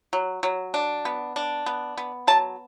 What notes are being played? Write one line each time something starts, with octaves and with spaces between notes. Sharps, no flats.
F#3
F#3
D4
B3
D4
B3
B3
F#3 A5